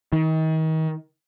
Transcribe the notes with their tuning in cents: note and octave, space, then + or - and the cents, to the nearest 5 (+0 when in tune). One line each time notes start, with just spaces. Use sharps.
D#3 +35